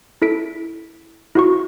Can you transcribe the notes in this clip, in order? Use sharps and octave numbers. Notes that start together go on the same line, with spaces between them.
E4 A4 B6 D7
E4 F#4 C#6